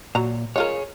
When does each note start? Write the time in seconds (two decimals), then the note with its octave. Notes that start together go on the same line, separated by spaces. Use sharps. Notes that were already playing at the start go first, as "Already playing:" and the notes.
0.15 A#2 F#3 A#5
0.56 G#3 F4 G#4 A#4 C#5